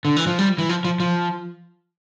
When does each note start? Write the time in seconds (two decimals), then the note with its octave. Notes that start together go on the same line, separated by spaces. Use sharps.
0.05 D3
0.16 E3
0.27 F3
0.38 G3
0.58 E3
0.69 F3
0.85 F3
1.00 F3